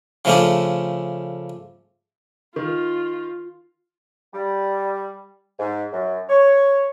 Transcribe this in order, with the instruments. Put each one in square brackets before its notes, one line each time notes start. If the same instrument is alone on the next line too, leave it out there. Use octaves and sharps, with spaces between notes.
[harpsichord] C#3 F3 A3 C#4 D4
[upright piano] D#3 [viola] F4
[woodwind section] G3
G#2
F#2
C#5